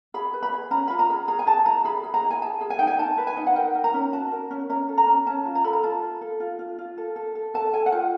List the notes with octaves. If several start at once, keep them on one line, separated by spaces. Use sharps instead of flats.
G#4 B5
B4
B5
G#4
C#4 A#5
F4 B5
A#5
G#4
G#4 A#5
G#5
G#4 A5
E4 A#5
G#4 B5
G#4
A#5
E4
G#5
G#4 A5
G#4
G#5
D#4 G5
G#5
D#4 A5
B4
G#5
D#4
F#5
A#4 G5
A#4
A#5
C#4
F#4 A5
A#4
C#4
C#4 A#5
A4
A#5
C#4
C#4 A5
F4
A#5
A4 B5
A#5
F4 A5
F4
A4
F4
F4
F4
A4
A4
A4
A4 A5
A4 G#5
F#5
F4 G5